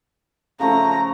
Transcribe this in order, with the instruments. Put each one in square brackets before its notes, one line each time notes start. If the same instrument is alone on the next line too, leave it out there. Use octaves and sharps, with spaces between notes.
[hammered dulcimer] C#3 F3 A3 [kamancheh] A#5